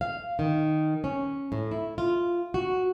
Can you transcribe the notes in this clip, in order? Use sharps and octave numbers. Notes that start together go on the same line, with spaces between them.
F5
D#3
C#4
A2
E4
F4
F#4